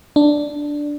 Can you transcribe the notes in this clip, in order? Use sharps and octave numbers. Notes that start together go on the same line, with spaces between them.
D4